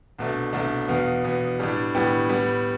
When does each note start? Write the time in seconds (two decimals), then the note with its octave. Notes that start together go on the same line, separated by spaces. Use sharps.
0.18 C2 B2 A3 D4
0.53 C2 B2 A3 D4
0.88 E2 B2 B3 F5
1.24 E2 B2 B3
1.60 A2 G3 B3 D4
1.95 A2 G3 B3 D4 G5
2.29 A2 G3 B3